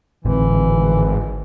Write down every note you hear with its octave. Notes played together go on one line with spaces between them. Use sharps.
G#1 A2 D3 E3 C4